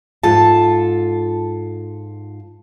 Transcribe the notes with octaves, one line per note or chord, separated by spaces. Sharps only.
G#2 F4 A4 A5